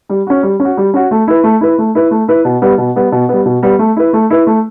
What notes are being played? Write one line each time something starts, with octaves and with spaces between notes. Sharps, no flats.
G3
C#4 F#4
G3
C#4
F#4
G3
C#4 F#4
A3
E4 B4
A3
E4 B4
A3
E4 B4
A3
E4 B4
B2
G3 B3
B2
G3 B3
B2
G3 B3
B2
G3 B3
A3
E4 B4
A3
E4 B4
A3